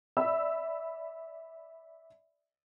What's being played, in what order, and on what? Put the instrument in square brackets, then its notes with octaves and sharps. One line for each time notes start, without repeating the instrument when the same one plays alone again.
[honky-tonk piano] D5 E5 B5 E6